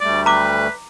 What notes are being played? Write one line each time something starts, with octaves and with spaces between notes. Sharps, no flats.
D2 G3 A3 D5
B4 A#5 D6